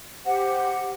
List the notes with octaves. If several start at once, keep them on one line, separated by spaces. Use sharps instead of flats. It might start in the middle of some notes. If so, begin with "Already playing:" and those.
G4 C5 F#5